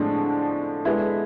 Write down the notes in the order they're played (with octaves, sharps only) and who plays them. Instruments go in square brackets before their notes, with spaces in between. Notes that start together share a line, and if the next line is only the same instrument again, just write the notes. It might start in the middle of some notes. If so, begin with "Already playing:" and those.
Already playing: [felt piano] A2 F3 G#3 C4 [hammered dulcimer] D3
[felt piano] G#3 B3 E4